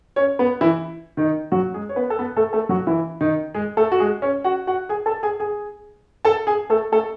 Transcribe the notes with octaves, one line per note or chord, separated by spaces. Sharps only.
C#4 C#5
B3 B4
E3 E4
D#3 D#4
F#3 F#4
G#3 G#4
C#5
B3 B4
A4
B3 B4
A3 A4
A3 A4
F#3 F#4
E3 E4
D#3 D#4
G#3 G#4
A3 A4
F#4
G#3 G#4
C#4 C#5
F#4 F#5
F#4 F#5
G#4 G#5
A4 A5
G#4 G#5
G#4 G#5
A4 A5
G#4 G#5
A3 A4
A3 A4